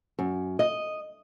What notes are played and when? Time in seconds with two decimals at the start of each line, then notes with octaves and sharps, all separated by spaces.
0.19 F#2
0.59 D#5